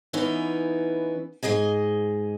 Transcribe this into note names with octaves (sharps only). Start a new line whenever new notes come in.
E3 B3 C#4 D#4 E4
G#2 E3 G#4 D#5 G#5